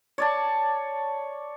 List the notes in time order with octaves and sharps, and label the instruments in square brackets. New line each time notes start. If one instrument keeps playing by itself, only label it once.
[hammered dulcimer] C#5 D5 A5